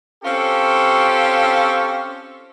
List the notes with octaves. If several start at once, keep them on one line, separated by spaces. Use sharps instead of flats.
C4 C#4 F4 G4 A4